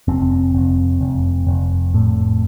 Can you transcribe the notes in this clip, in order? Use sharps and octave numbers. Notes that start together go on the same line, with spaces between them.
F1 C4
F1
F1
F1
A2